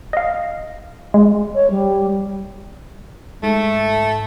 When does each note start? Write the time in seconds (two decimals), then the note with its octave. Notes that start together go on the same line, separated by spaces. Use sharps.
0.13 D#5 F5
1.14 G#3
1.54 C#5
1.70 G3
3.43 G#2 A3